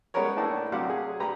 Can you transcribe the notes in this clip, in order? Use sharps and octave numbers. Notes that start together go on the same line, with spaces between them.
G3 G#3 B3 C#4 A#4 C#5
A2 A#3 D4 E4 A5
D2 C3 F#3 F5 F#5 D6
G#4
D2 G4 B4 A#5